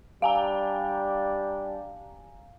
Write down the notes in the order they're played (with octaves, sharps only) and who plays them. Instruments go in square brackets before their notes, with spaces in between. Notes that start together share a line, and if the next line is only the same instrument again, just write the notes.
[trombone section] G3 D4 G4 [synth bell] F5 G#5 A#5